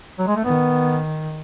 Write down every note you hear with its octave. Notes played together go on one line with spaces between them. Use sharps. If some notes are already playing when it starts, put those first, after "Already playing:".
F#3
G#3
A3
D#3 B3